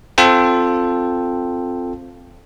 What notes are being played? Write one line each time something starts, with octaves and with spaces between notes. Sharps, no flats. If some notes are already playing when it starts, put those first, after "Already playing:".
C4 F4 A4 G5